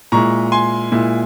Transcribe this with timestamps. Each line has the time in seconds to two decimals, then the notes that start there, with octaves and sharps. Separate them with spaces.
0.12 A#2 G#3 E4 A#5 C#6
0.52 G#5 C6
0.92 A#2 G#3 E4